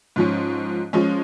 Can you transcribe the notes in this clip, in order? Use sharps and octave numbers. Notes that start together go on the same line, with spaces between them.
G#2 F3 C#4
F3 G#3 C#4